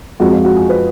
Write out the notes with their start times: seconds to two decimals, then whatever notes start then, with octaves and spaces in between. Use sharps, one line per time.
0.20 F2 F3 G#3 F#4
0.32 F4
0.45 F#4
0.56 G#4
0.69 B4